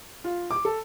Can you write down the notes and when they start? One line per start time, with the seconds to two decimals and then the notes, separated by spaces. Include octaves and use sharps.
0.24 F4
0.51 D6
0.65 A4